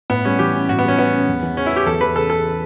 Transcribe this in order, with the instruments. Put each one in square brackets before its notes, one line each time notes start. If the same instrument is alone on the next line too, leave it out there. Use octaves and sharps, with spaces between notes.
[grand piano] A2 [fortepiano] B3
[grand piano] G3 [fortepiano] C#4
[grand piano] E3 [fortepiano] G4
[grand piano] C#4
[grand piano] A2 [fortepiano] F#4
[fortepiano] B3
[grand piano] G3 [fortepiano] C#4
[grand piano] E3 [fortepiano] B3
[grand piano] C#4
E2
E3
[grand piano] C#3 [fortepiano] C#4
[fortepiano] E4
[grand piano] B3
[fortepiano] G4
[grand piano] E2 [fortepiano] A4
[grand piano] E3 [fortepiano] B4
[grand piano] C#3 [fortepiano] A4
[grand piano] B3 [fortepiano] A4